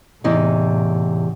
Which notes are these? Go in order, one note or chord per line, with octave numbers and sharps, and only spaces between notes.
E2 A2 C3 D#4